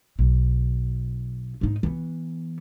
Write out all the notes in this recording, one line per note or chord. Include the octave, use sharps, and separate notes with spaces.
B1
G#2 D#4
E3 B3